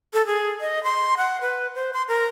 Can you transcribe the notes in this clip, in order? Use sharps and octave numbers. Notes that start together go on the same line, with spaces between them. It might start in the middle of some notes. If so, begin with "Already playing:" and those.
A4
G#4
D#5
C6
F#5
B4
C5
C6
A#4